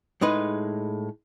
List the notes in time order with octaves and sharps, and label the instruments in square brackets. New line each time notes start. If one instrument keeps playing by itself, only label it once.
[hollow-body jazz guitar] A2 G#3 D#4 B4